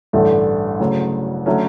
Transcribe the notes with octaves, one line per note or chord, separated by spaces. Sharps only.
A1 G2 D3 A3
D2 C#3 F#3
D3 F#3 A3 C#4